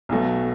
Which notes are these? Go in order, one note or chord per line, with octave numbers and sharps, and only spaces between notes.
B1 B2 F#3 A3